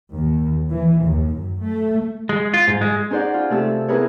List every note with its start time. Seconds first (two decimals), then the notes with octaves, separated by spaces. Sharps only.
0.14 D#2
0.71 E3
1.02 D#2
1.34 F#2
1.64 A3
2.29 G#3
2.54 F4
2.68 G#2
2.81 G#3
3.10 C#4 D#4 G#4 C5 D5 F#5
3.34 F4
3.50 C3 A3 A5 E6
3.88 B3 E4 G#4 A#4 B4 C#5